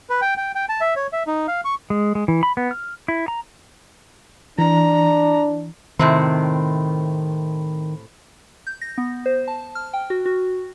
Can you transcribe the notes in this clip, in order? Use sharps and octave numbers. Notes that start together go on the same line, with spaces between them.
B4
G5
G5
G5
A5
E5
C#5
E5
D#4
F5
C#6
G#3
G#3
E3
B5
B3
F6
E4
A#5
E3 D4 A#5
A2 C3 D#3 C4
G6
A#6
B3
C5
A5
F6
G5
F#4
F#4